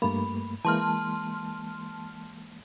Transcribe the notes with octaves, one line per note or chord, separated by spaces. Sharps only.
G2 A3 A#3 B5
E3 G#3 A#3 A5 C6 F6